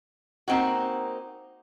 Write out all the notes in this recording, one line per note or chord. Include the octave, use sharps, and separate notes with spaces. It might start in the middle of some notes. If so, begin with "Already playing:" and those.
A#3 C4 D#4 F#4